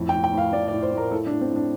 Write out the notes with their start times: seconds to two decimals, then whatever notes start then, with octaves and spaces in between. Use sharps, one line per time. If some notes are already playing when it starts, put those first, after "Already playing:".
Already playing: F2 A2
0.09 G5
0.14 A2
0.24 G5
0.33 A2 F5
0.53 A2 D5
0.68 D5
0.72 A2
0.83 C5
0.92 A2
0.97 A#4
1.11 A2 A4
1.27 D4
1.31 A2
1.41 C4
1.51 A2
1.56 D4